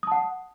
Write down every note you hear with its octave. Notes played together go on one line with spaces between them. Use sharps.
F#5 A5 D#6